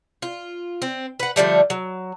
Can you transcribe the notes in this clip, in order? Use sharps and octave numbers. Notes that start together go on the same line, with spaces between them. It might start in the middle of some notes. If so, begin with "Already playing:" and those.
F4
C4
B4 F#5
D3 F3 G3 A3
F#3